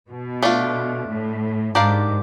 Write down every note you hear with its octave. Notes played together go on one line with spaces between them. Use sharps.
B2
A3 D4 F4
A2
G#2 D4 G4 A#4 D5 F5